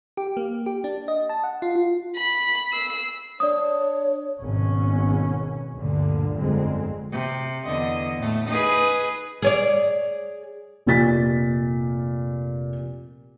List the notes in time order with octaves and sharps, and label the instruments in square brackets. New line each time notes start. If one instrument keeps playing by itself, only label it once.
[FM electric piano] G4
A#3
G4
D4
D#5
A5
F#5
F4
F4
[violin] B5
E6 C7
[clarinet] D4 [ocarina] C#5 [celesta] D5 D#6
[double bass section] G#1 B2 C#4
D2 G2 A#2 D3
G1 F2 D3 G#3 C4
[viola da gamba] C3
E2 D3 D#5
A2 A3
D#4 G#4 B4
[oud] G#4 C#5 D5
[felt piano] F1 A#2 G4 A6 B6